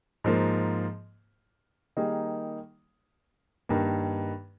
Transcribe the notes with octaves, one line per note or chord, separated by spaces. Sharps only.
G#2 F3 A#3
D#3 G3 A#3 D#4 G#4
G2 D#3 A#3